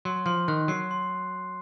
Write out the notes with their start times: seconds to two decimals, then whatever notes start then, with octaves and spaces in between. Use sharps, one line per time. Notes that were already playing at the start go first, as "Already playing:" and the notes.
0.05 F#3 C6
0.26 F3 C6
0.48 D#3 F#6
0.68 F#3 C7
0.91 C6